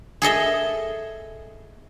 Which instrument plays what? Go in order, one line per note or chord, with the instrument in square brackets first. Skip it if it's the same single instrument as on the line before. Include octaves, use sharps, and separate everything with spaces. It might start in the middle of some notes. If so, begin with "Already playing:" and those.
[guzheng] G#4 A4 D#5 E5